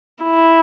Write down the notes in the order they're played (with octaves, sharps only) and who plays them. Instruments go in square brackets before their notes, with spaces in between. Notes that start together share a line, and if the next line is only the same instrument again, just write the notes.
[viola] E4